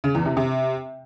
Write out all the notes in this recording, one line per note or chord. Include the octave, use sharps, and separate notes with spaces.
C#3
E2
C3
C3